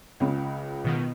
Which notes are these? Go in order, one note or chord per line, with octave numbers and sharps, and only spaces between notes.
C#2 C#3
B2 D#3 B3